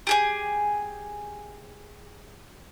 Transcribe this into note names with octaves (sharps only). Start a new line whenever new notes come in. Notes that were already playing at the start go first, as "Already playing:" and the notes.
G4 G#4 G#5